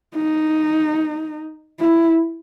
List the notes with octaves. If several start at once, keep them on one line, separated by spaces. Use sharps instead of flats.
D#4
E4